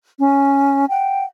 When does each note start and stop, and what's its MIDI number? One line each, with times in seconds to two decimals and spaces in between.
0.18 0.85 61
0.90 1.24 78
0.90 1.24 79